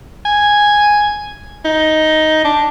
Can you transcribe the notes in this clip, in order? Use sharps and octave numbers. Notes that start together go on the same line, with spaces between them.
G#5
D#4
D4